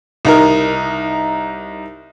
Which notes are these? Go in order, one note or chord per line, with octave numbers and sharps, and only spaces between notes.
C2 D#4 A#4